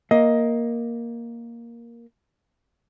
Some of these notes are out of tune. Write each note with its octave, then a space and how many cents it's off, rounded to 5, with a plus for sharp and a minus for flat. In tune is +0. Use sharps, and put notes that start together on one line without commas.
A#3 +5 D#5 +15